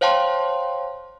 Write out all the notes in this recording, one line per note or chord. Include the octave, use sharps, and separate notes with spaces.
C5 C#5 F5 G5 A5 C6